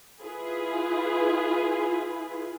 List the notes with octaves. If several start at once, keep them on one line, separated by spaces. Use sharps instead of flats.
E4 F4 G#4 B4